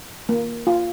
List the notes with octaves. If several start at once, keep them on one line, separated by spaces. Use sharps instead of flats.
A#3
F4